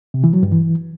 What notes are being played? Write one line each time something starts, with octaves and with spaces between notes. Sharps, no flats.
C3
E3
F#3
G2
E3